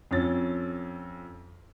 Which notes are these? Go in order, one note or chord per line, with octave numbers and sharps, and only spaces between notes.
F2 C#4 A6